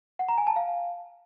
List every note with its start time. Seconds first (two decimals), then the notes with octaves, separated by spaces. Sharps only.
0.19 F#5
0.28 A#5
0.38 G#5
0.47 A5
0.56 F5